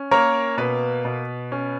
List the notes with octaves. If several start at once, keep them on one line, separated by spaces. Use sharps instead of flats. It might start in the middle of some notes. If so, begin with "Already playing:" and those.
Already playing: C#4
A#3 A#4 C#5
B2 B4
B2
C#4